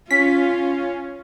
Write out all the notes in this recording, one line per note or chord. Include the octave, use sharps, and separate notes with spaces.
C#4 F4 B6